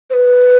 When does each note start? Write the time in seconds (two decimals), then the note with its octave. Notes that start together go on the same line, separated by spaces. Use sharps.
0.10 C5
0.13 B4